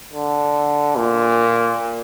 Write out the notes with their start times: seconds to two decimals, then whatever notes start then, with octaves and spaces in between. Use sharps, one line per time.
0.13 D3
0.97 A#2